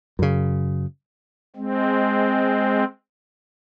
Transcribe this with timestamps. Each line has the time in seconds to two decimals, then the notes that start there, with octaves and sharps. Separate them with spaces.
0.19 F#2 C#3
1.56 G#3 C4